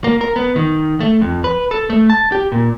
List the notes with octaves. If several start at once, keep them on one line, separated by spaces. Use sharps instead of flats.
A#3
A#4
B3
D#3
A3
F2
B4
A4
A3
A5
G4
A#2